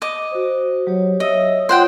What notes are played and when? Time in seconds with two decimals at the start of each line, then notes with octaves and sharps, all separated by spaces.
0.02 D#5 D6
0.32 F#4 C5
0.87 F#3 G4 C#5
1.20 C#5 D#5 E5 E6
1.69 F4 C5 C#5 F#5 G5